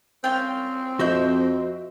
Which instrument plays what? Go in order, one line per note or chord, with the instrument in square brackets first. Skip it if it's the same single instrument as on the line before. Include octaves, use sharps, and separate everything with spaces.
[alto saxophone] C4 [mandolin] C#4 F4 G5
[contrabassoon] F2 [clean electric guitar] F#4 D#5 [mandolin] C5 E5 G6